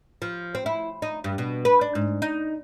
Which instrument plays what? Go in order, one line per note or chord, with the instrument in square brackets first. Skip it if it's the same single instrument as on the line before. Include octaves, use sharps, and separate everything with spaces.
[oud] F3
C4
E4
D#4
G2
B2
B4
D4
G#2
D#4